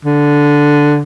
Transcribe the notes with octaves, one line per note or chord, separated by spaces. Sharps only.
D3